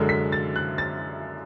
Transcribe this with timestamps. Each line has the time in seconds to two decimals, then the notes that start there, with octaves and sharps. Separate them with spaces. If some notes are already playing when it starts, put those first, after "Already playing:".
Already playing: F#2 D3 G#3
0.09 B6
0.32 A6
0.56 F#6
0.78 A6